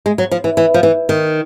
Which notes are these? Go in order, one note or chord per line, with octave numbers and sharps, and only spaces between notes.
G#3
F#3
F3
E3
E3
F3
E3
D#3